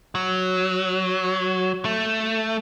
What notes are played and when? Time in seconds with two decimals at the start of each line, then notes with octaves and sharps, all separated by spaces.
0.15 F#3
1.85 A3